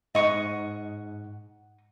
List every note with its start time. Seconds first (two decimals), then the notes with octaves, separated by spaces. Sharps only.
0.15 G#2 D#5 F#5 C#6 D#6